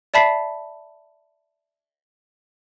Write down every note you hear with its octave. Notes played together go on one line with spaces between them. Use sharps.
D5 E5 A5 B5 B6 C7